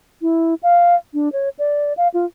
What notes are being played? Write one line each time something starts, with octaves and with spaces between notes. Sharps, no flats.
E4
F5
D4
C#5
D5
F5
F4